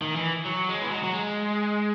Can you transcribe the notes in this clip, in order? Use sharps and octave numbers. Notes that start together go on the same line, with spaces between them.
D#3
E3
F#3
G#3
E3
F#3
F#3
G#3